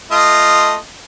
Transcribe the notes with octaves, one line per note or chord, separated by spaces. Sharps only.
A3 F4 D#5